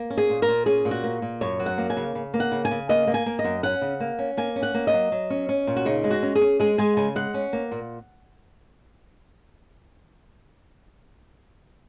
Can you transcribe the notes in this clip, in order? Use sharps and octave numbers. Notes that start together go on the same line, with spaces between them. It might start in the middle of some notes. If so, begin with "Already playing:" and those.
Already playing: A#3
C#4
G#4
A#2
A#4
A#2
C#4 G#4
A#2
F#4
A#3
A#2
F#2 C#5
F#3
F#5
A#3
G#5
C#3
C#3
A#3
F#5
C#3
G#5
C#3
A#3 D#5
A#3
G#5
A#3
D#5
F#2
C#4 F#5
C#3
A#3
C#4
A#3 G#5
C#4
F#5
A#3
D#5
F#3
F#3
C#4
C#4
A#2
F#4
C#3 D#4
G#3
F#4
C#4
G#4
C#4
G#3 G#4
G#3 G#5
C#3 G#5
G#3 F#5
C#4
A#3
A#2